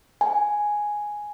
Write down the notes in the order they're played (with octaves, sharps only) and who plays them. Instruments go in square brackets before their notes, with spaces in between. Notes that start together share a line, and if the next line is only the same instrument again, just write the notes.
[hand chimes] G#5